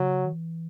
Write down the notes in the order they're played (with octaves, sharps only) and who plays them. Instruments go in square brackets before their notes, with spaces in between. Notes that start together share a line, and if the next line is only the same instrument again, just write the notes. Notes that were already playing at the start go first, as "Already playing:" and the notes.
Already playing: [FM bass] C#3 [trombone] F#3
[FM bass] D#3
E3